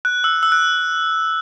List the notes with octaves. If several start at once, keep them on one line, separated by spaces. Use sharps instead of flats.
F#6
E6
E6
F#6